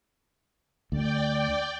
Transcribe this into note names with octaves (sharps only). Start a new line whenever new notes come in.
D2 D5 G5